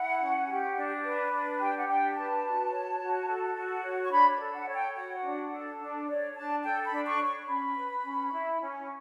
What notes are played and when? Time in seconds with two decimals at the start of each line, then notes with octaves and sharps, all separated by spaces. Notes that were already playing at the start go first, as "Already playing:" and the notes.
Already playing: E4 F#5
0.20 C#4
0.47 G4
0.76 D4
1.03 B4
1.32 D4
1.59 G4 G5
1.77 F#5
1.87 D4 G5
2.15 B4 A5
2.44 F#4
2.71 C#5
2.99 F#4
3.28 A4
3.55 F#4
3.83 C#5
4.04 C#6
4.11 D4 B5
4.40 A4
4.54 F#5
4.67 C#5
4.74 G5
4.96 F#4 F#5
5.24 D4
5.52 A4
5.80 D4
6.08 C#5 D5
6.35 D4 A5
6.63 A4 G5
6.85 B5
6.91 D4
7.06 C#6
7.20 C#5
7.26 C#6
7.48 C#4 B5
7.76 B4
8.04 C#4
8.32 E4
8.60 C#4